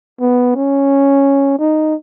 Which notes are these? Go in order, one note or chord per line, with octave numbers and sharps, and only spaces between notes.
B3
C#4
D#4